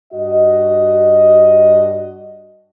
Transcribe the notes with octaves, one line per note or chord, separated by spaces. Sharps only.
G2 F#4 D#5